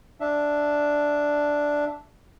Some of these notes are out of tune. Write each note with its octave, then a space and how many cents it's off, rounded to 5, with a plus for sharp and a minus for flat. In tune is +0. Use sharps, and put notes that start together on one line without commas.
D4 +0 E5 +0